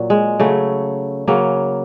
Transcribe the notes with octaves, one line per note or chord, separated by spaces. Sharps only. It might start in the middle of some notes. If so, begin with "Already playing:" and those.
Already playing: A#2 F#3
G#3
C#3 F#3 A3
C#3 F#3 A#3